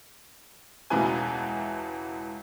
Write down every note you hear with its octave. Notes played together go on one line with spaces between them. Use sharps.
E1 C#2 B2 E3 B4 G#5